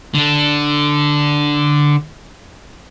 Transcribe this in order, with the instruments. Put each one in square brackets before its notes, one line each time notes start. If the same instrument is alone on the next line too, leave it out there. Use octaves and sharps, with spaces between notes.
[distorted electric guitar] D3 D4